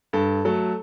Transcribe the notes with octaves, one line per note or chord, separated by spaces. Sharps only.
G2 A4
F#3 A3 A4